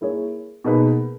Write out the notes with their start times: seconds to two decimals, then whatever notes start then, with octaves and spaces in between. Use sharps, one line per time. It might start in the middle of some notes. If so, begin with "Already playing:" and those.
0.01 A#3 E4 G#4 C#5
0.64 B2 A#3 D#4 G#4 B4